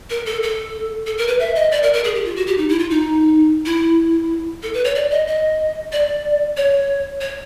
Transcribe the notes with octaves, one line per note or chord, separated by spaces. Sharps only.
A#4
A4
A4
A4
A#4
B4
E5
D#5
D5
A#4
A#4
G#4
G4
F4
F#4
G4
D#4
E4
F4
D#4
E4
A4
B4
C#5
D5
D#5
D#5
D5
C#5
C#5